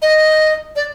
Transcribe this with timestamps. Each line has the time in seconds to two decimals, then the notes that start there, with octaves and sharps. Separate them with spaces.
0.02 D#5
0.76 D5